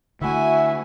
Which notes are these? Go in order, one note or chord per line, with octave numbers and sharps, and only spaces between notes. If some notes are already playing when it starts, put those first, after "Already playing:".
D3 A3 E4 F#4 E5 G#5